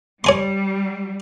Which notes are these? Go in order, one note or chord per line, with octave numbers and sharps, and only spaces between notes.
G3 C#5 G#5 C6